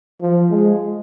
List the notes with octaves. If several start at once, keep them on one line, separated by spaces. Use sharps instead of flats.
F3
G#3